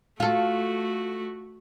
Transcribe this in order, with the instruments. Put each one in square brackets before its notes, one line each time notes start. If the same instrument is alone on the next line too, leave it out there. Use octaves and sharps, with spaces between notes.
[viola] A3 F#4 [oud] F4 A4